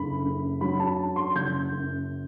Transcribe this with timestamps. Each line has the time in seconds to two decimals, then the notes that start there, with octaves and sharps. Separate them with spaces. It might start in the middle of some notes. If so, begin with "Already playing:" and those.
Already playing: F#1 D3 B5
0.24 F#2
0.61 F#3 B5
0.80 A5
0.98 D3
1.16 C6
1.35 F#1 G6
1.72 F#2